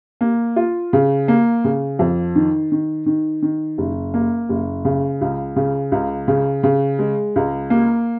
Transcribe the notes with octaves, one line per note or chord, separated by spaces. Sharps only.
A#3
F4
C#3
A#3
C#3
F2
D#3
D#3
D#3
D#3
F#1
A#3
F#1
C#3
C#2
C#3
C#2
C#3
C#3
G#3
C#2
A#3